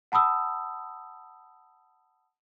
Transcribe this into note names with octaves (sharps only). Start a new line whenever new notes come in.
F#5 A5 B5 D#6 E6